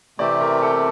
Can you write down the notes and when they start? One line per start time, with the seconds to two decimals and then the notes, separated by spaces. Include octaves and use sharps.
0.18 C3 E3 A3 C4 G4 D5
0.41 A#4
0.62 A4